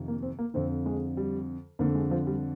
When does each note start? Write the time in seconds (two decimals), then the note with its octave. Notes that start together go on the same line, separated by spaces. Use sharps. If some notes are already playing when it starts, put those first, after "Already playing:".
Already playing: F2 C3 D#3
0.08 A#3
0.23 C4
0.39 A#3
0.54 F2 D3 C4
0.86 G#3
1.17 G3
1.79 F2 D3 A#3
1.95 G#3
2.11 F3
2.27 G3